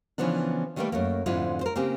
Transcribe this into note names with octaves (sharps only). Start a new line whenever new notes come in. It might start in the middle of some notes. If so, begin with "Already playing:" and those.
C#3 E3 F3 B3 D4
D#3 G3 A3 A#3 B4 G5
F#2 A3 A#3
F2 G#2 D3 G#3 E4 F4
A#4 C5
C#3 A#3 C4 G4